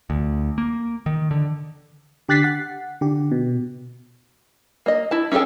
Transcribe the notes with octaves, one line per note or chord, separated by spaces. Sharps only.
D2
A#3
D#3
D3
D3 G4 F#6 A6 B6 C7
F#5
D3 G4
B2
A#3 D#5
E4 A5
C#4 F4 G#4 A4 G5